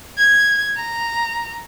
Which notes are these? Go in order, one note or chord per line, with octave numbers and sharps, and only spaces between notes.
G#6
A#5